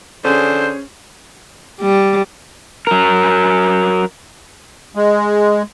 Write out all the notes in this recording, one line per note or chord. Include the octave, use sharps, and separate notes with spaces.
D3 C#4 G#4 C5
G3
F#3 A#4
G#3